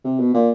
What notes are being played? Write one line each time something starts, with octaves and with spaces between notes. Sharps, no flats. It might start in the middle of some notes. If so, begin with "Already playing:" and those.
C3
B2
A#2